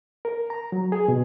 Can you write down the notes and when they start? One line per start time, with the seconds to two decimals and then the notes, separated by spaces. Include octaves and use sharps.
0.25 A#4
0.50 A#5
0.72 F#3
0.92 G#4
1.08 B2